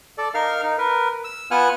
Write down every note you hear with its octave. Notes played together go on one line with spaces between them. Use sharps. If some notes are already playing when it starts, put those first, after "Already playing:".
A4 D5
D#4 A#4 F5 F6
D#4
A#4 B4
E6
B3 F4 F#5 G#5 F6 F#6